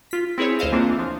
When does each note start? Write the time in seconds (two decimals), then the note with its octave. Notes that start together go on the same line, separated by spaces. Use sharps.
0.11 F4 B6
0.38 C4 E4 G#4 B4 C#5
0.59 D2 C5 D#5 F5 E7
0.72 E3 A#3 C4 D4 F4
0.99 F3